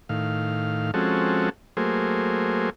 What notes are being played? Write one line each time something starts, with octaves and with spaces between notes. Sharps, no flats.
A2 D#3 F5
F3 G#3 C4 C#4 F#4 A4
F#3 A3 A#3 G#4 C5